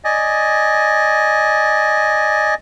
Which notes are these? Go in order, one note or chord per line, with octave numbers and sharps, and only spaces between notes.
D5 D#5 G#5